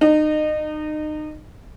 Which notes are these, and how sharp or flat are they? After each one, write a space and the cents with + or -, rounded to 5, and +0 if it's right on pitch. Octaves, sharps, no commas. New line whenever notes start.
D#4 -30